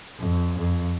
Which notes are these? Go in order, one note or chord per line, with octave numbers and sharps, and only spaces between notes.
F2
F2